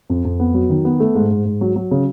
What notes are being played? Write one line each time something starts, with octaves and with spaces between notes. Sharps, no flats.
F2
F2
B3
F#3
D#3
B3
A3
G#2
G#2
G#2
F#3
F#3
C#3